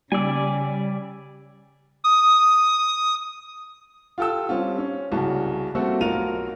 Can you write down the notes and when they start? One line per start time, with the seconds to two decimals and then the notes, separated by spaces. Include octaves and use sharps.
0.12 C#3 G3 D5 G#5 E6
2.04 D#6
4.18 F4 G4 A4 G5 E6
4.49 G3 C4 C#4 F4
4.78 C#4
5.12 C2 C#3 F#4 A5
5.75 G3 A3 A#3 C4 F#4 A4
6.01 B1 F4 F#4 A#4 D#7 F7